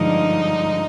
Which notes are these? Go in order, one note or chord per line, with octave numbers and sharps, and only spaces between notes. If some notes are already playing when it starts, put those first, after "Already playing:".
Already playing: G2 D3 F3 G#3 D#4 D#5